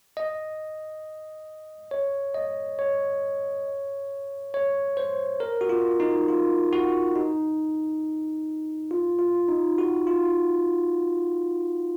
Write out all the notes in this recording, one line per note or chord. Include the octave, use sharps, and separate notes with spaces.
D#5
C#5
D#5
C#5
C#5
C5
A#4
F#4
F4
D#4
F4
F#4
D#4
F4
F4
D#4
F#4
F4